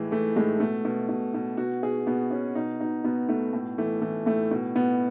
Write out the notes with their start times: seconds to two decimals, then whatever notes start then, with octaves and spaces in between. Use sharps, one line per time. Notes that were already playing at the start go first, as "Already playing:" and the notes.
Already playing: A2 E3 G#3
0.11 E3 A3
0.36 A2 G#3
0.60 B2 A3
0.85 B2
1.09 B2
1.34 B2
1.57 B2 F#4
1.83 B2 G#4
2.07 B2 B3
2.31 B2 C#4
2.55 B2 D#4
2.80 B2 D#4
3.04 B2 B3
3.29 B2 A3
3.53 A2
3.78 E3 A3
4.02 E3 A3
4.26 A2 A3
4.51 B2
4.75 B2 B3